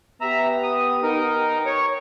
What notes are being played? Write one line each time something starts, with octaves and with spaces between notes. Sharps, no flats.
B3 G4 E5 A#5
D#6
D#4 A#4
C#5